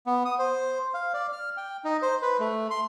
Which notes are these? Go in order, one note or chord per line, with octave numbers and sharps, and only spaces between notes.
B3
D#6
C5
F5
D5
F6
G5
D#4
C5
B4
A3
C6